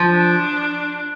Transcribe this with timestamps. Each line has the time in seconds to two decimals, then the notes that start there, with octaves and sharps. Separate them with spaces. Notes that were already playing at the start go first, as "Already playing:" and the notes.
Already playing: F3
0.10 D4